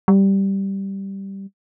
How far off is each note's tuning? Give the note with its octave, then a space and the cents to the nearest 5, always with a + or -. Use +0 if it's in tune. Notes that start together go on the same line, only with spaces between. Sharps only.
G3 -5